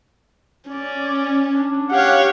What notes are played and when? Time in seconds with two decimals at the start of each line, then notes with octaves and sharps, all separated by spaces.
0.70 C#4 D5
1.56 D4
1.92 G4 C#5 F5 F#5